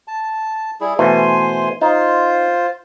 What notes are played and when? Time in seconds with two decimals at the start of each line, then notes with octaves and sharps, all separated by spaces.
0.08 A5
0.81 G3 E4 G#4
0.99 B2 E3 A3 C5 G#5 C6
1.81 D#4 F4 C5